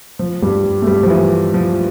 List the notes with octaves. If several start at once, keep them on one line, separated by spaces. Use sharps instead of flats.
F3
G2 G3
A3
G2 G3
F3
E3
F3